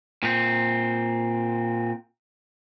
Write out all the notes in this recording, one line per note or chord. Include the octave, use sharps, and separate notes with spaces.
A#2 C4